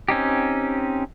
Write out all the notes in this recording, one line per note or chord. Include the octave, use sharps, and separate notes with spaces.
C4 C#4 D#4 G4